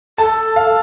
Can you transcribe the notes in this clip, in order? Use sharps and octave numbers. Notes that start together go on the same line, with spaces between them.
A4 A5
F5